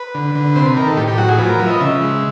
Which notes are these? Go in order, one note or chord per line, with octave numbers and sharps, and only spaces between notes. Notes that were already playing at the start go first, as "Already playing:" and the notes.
Already playing: B4
D3
D3
C3 C5
B4
D#3 A#4
A4
A2 G4
G4
F#3 F#4
G#4
F3 B4
A#4
F3 B4
E5
D#5
C#3 E5
G#3